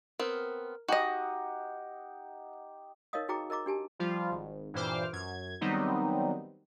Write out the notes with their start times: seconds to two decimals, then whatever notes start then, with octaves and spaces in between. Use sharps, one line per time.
0.20 B3 C4 A#4 F6
0.89 D#4 F#4 G4 D#5 F#5
3.13 D#4 A#4 C#5 D#5 F5 D#6
3.28 D#4 F#4 G#4 G5 A#5 D6
3.50 A#4 D#5 A#5 D6
3.66 D4 G4 G#5 A5
3.99 F3 G3 F4
4.31 G#1
4.74 G2 A#2 E3 C5 D6 F6
5.13 F#2 G#6
5.61 D#3 F#3 G3 B3 C4 D#4